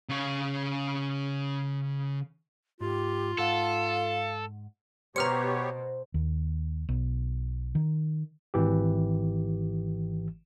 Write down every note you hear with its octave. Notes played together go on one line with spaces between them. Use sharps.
C#3 C#5
G#2 F4 G4
G#2 A4 F5 F#5
B2 B3 G4 C5 C#5 A#5 F6 C#7
D#2
B1
D#3
G#1 E3 G4